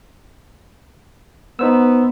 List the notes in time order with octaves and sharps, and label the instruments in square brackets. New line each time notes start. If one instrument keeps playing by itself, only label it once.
[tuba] B3 [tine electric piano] D#4 C5 E6